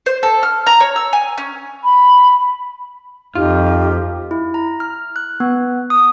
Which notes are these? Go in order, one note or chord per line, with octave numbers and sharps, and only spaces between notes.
C5
A4
F6
A#5
C#5
E6
G#5
C#4
B5
F2 D#4 F4 G4
E4
A#5
F6
F#6
B3
D#6